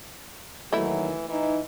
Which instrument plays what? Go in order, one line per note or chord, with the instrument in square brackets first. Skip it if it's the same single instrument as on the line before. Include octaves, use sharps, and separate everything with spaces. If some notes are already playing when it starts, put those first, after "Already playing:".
[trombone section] D#2 D#3 F#3 [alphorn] E3 [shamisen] A3 E4
[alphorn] E3 [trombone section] D#4